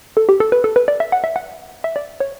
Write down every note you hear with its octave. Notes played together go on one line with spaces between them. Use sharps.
A4
G4
A4
B4
A4
B4
D5
E5
F#5
E5
F#5
E5
D5
C#5